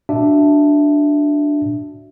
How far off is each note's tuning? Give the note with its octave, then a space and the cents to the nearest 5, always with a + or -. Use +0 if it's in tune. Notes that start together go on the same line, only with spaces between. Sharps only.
D4 +0 F#4 +0 E5 +0